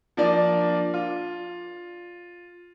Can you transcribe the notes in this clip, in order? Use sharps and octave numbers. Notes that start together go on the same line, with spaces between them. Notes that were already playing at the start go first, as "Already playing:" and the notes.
F3 A#3 D4 D5
F4